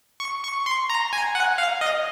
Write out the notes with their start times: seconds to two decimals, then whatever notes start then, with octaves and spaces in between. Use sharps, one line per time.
0.20 C#6
0.43 C#6
0.66 C6
0.90 A#5
1.13 G#5
1.35 F#5
1.58 F5
1.81 D#5